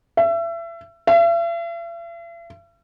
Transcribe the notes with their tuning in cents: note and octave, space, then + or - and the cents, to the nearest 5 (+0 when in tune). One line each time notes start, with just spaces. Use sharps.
E5 +30
E5 +45